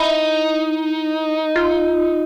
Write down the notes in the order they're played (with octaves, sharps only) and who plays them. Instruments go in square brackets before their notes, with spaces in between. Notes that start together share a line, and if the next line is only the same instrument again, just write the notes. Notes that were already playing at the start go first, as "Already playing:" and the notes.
Already playing: [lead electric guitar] D#4 [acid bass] E4
[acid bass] F4